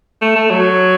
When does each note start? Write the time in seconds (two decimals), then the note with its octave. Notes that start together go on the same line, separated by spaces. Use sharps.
0.22 A3
0.36 A3
0.50 F#3